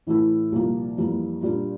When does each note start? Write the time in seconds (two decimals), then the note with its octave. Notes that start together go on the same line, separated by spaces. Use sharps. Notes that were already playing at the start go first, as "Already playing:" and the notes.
0.07 A2 E3 A3 E4
0.52 C2 A#2 F3 A#3 F4
0.98 F2 E3 G3 A#3
1.43 A#2 G3 A#3 D4